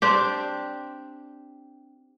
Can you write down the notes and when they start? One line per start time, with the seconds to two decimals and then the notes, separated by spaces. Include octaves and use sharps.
0.02 C4 D4 G4